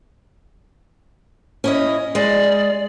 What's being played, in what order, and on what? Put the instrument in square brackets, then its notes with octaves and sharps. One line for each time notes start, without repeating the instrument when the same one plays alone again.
[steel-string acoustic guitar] C#4 E4 D#5
[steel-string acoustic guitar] G#3 [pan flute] D5